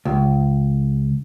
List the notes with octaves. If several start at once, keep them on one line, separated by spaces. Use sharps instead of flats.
C#2